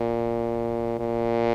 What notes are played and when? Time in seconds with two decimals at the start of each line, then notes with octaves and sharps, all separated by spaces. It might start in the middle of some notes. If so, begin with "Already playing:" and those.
Already playing: A#2
1.00 A#2